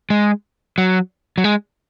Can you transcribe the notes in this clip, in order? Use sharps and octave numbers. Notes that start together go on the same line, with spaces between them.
G#3
F#3
F#3
G#3